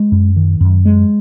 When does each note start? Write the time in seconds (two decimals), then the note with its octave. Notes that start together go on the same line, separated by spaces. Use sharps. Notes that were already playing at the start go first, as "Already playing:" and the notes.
Already playing: G#3
0.12 F#2
0.36 D#3
0.61 F#2
0.85 G#3